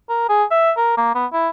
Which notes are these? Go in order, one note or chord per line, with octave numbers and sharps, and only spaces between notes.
A#4
G#4
E5
A#4
A#3
B3
E4